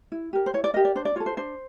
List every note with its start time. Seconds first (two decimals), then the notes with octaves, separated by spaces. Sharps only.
0.12 E4
0.33 G4 A#4
0.46 C5
0.54 E4 C#5
0.64 D5
0.74 G4 A#4 D#5
0.85 D5
0.95 D4 C5
1.05 D5
1.16 F4 A4 C#5
1.26 C5
1.37 D4 C5